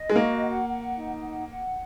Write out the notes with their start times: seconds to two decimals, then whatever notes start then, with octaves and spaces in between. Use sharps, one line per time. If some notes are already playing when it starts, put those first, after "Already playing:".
Already playing: D#5
0.10 G#3
0.16 A#3 F#4
0.42 F#5
0.68 F#5
0.95 D#4
1.22 F#5
1.48 F#5